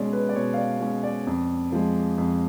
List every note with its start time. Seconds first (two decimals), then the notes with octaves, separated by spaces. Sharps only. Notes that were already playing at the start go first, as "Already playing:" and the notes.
Already playing: B2 G#3 C#4 D5
0.13 B4
0.29 D5
0.36 B2 C#5
0.54 F5
0.57 D5
0.81 G#3 C#4
1.03 D5
1.27 F2
1.72 F3 G#3
2.18 F2